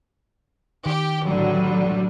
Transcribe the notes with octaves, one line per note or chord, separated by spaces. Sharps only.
D#3 G4
A1 D3 F#3 G3